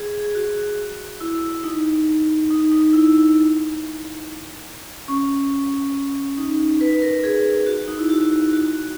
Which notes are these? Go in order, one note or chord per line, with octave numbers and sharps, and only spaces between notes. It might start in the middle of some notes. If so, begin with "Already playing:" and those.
Already playing: G#4
G#4
F#4
E4
D#4
D#4
D#4
E4
C#4
D#4
B4
A#4
G#4
F#4
D#4
E4
F#4
F#4